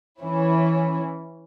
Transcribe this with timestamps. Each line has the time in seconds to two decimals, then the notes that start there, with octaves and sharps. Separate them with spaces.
0.21 E3 C#4 E4